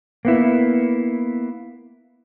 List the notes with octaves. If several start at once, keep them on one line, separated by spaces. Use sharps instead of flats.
A#3 B3 E4